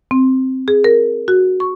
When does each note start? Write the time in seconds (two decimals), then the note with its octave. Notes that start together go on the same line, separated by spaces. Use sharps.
0.11 C4
0.68 G#4
0.84 A#4
1.28 F#4
1.60 C#6